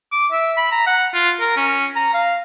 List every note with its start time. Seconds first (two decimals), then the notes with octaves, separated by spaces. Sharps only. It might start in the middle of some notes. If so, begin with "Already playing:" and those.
0.12 D6
0.31 E5
0.57 B5
0.72 A#5
0.86 F#5
1.14 F4
1.40 A#4
1.56 C#4
1.96 A#5
2.13 F5